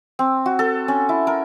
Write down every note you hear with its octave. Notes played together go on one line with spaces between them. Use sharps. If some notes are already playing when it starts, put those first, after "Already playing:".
C4
F#4
A4
C#4
E4
A#4